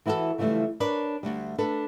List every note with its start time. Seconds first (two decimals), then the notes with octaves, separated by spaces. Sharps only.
0.06 E3 E4 F#4 G4 A4
0.38 C#3 E3 F3 G3 A3
0.80 D4 A#4 B4 C#5 D5
1.23 D2 G3
1.58 D4 A4 B4